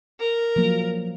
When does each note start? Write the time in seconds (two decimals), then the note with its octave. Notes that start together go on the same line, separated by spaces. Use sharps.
0.20 A#4
0.56 F3 F#3 A#3